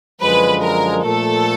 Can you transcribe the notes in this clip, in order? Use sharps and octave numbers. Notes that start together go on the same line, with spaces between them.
F#2 D3 F3 G#3 B4
A#4
A#2 F3 A3 A4